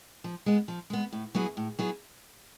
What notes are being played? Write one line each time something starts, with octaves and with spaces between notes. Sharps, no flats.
F3
G#3 B3
F3
G#3 B3
A2
F#3 B3 E4 G#4
A2
F#3 B3 E4 G#4